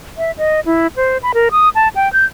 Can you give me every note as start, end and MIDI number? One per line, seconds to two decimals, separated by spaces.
0.18 0.31 76
0.38 0.60 75
0.66 0.87 64
0.96 1.18 72
1.23 1.32 83
1.34 1.49 70
1.51 1.69 87
1.75 1.88 81
1.95 2.11 79
2.13 2.25 91